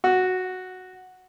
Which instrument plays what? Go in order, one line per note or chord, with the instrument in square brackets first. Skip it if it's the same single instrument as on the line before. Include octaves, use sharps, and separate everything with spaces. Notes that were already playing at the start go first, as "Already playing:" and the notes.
[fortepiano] F#4